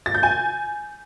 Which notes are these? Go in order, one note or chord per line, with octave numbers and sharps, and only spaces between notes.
A6
G6
G#5